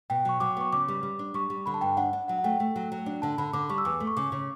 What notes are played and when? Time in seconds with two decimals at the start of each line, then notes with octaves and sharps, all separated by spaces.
0.10 B2 G5
0.25 F#3 C#6
0.40 F#3 D6
0.57 B3 C#6
0.72 C#3 D6
0.88 G3
1.03 G3
1.19 D4
1.34 G3 C#6
1.50 G3
1.66 D3 B5
1.74 A5
1.81 G2 G5
1.97 D4 F#5
2.13 D4
2.28 F#3 F#5
2.39 F#5
2.44 A3 G5
2.60 A3
2.76 F#3
2.92 F#3
3.06 D4
3.22 D3 A5
3.38 D3 B5
3.53 D3 D6
3.69 G3 C#6
3.78 E6
3.85 E2 D6
4.00 A3
4.07 C#6
4.17 C#3 D6
4.32 C#3